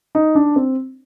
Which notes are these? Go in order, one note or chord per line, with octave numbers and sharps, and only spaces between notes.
D#4
D4
C4